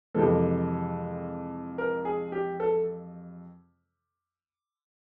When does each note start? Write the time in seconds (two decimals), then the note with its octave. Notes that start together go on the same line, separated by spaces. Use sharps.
0.14 F2 C3 E3 G#3 A4
1.78 A#4
2.05 G#4
2.32 G4
2.60 A4